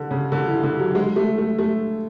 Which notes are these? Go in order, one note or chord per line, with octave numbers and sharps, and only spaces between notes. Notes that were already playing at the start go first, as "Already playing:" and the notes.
Already playing: D3
C#3
D3
E3
D3
F#3
G#3
A3
A3
A3